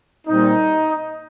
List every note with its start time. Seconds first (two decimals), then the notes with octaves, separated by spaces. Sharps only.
0.27 A#2 G3 C4 D#4